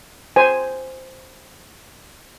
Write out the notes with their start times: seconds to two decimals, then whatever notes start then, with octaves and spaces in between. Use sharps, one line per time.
0.36 C5 G#5